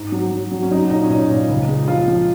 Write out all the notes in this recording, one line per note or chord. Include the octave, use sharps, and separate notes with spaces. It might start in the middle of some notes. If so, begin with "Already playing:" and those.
Already playing: G#2
F#3
F#3
F#3
C#4
F#3 D#4
A#2 D#4
C#4
A#2 D#4
A#2
C#2
G#3
F3 F4
F3